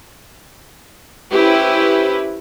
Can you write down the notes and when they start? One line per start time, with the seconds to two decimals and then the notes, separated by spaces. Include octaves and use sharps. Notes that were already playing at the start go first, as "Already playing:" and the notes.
1.32 C#4 E4 G4 B4 C5